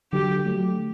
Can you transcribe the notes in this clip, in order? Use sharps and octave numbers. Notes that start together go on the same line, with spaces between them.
D3 F#3 G4
F#3 A3